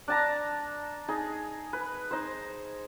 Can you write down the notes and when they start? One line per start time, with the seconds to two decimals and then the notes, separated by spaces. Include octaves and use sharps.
0.08 D4 A5 A#5
1.08 D#4 G#4
1.73 B4
2.11 D#4 C5